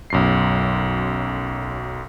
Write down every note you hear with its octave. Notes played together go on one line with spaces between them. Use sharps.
B1 F#2 C7